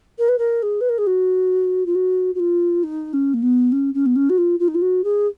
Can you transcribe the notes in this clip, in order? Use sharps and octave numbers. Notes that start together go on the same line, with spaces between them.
A#4
B4
A#4
G#4
B4
A#4
G#4
F#4
F4
F#4
F#4
F4
D#4
C#4
A#3
B3
C#4
C#4
B3
C#4
F#4
F4
F4
D#4
F4
F#4
G#4